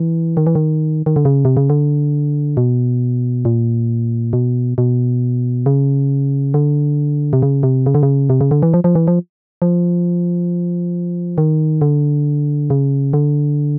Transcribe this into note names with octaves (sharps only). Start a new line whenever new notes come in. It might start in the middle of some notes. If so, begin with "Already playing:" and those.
Already playing: E3
D#3
E3
D#3
D#3
D3
C#3
C3
C#3
D3
B2
A#2
B2
B2
C#3
D3
C3
C#3
C3
C#3
D3
C#3
C3
C#3
D3
E3
F3
F3
E3
F3
F3
D#3
D3
C#3
D3